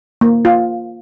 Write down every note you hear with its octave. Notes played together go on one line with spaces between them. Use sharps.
A#3
F4